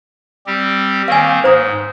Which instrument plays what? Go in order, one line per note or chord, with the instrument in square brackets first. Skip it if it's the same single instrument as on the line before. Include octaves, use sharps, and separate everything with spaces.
[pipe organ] G3 C4 G4
[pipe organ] D#3 A#3 C4 [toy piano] F5 G#5
[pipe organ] G#2 [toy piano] C5 A#5 D#6